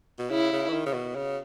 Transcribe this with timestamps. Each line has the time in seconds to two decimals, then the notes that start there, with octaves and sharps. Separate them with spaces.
0.19 B2
0.30 C#3 E4
0.52 C#3
0.69 E3
0.73 D#3
0.86 C#3
0.94 B2
1.16 C#3